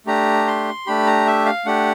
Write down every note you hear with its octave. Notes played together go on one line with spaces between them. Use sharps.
A3 D4 G4 A#5
C6
A3 D4 G4 B5
A#5
E5
F5
A3 D4 G4 F#5